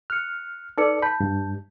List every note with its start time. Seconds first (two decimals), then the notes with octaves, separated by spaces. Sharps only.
0.10 F6 F#6 C#7
0.78 D#4 A4 B4 D5 C#7
1.02 A5 B5 G6
1.20 G2